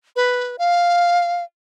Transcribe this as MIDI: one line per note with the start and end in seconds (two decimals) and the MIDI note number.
0.16 0.56 71
0.59 1.43 77